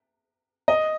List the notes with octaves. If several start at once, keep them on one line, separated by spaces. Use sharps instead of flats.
D#5